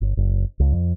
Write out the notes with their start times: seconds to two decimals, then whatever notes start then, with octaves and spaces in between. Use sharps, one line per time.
0.01 G1
0.17 F#1
0.60 C#2
0.73 F2